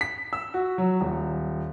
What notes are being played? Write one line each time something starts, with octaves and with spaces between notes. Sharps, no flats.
B6
E6
F#4
F#3
D#1